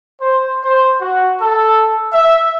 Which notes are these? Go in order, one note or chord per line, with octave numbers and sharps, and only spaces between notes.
C5
C5
F#4
A4
E5